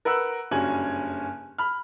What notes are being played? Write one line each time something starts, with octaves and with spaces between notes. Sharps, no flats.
A#4 B4 F#5 E6 F#6
F#1 G2 C#4 F#4 G#5 F#7
B5 F6